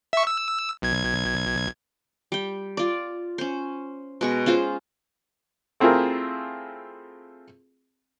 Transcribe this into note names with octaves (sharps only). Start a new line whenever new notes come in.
E5 C#6
E6
B1 G#6
G3 G5
F4 D5
C#4 C5
B2 G#3 C#6
C#4 F4 G#4 C5
A3 C4 E4 F4 G#4 A#4